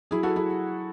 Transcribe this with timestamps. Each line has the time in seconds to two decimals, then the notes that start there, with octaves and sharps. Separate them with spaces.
0.11 F#3 E4 G#4
0.23 F#4 A4
0.36 F#3 E4 G#4